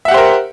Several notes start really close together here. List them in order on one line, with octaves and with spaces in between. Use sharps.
E5 F#5 G4 C5 A#4